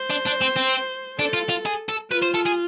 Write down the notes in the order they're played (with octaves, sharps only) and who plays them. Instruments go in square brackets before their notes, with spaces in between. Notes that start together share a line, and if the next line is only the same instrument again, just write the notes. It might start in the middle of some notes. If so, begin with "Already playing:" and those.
Already playing: [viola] C5
[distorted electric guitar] D4
D4
C4
C4
[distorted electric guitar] D4 [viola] A4
[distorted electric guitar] F4
F4
G#4
A4
[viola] F4 [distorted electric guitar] B4
[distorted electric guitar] C5
A4
G#4